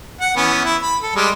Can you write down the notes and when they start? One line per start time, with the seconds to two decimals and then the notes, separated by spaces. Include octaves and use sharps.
0.21 F#5
0.36 E3 B3 C#4
0.64 E4
0.82 B5
1.03 A4
1.16 G3 G#3